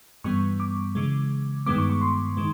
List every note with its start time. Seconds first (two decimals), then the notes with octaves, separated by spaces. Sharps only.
0.24 G2 E3 G3 B3 C#6
0.60 D6
0.95 C#3 E3 G#3
1.66 G2 D#3 G#3 B3 D6
1.78 C#6
1.90 C#6
2.01 C6
2.37 D#3 G#3